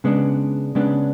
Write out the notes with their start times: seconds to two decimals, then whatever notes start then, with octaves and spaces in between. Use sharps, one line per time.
0.04 C#3 G#3 B3 D4
0.75 C#3 G#3 B3 D4